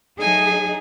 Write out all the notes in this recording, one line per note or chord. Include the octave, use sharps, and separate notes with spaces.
F#3 A3 D#4 G#4 G#5